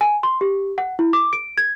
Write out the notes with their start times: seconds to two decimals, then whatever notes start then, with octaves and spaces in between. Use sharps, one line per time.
0.01 G#5
0.23 C6
0.41 G4
0.78 F#5
0.99 E4
1.13 D6
1.33 D7
1.58 G#6